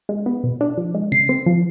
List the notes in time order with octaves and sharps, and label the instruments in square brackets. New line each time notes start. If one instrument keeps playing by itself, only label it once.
[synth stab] G#3
B3
B2
D4
F3
G#3
C#3 C7
C4
F3